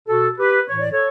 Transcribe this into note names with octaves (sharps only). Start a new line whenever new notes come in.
B2 F#4 A4
G4 B4
A2 E3 C#5
D5
A4 C#5